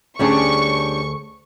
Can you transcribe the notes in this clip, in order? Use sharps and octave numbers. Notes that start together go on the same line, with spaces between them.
D2 G3 C#4 D4 G#4 C#6